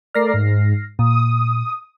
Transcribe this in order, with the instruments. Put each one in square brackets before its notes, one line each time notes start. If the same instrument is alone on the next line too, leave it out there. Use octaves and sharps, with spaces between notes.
[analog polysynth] A3 A#4 D5 [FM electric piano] F6 A#6 C7
[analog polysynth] G#2
[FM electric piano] A#2 [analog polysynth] D#6